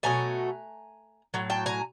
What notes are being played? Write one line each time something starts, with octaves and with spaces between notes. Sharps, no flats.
B2 F#3 A3 G#5 A#5
A2 F#3
G5 A5
G#5 A#5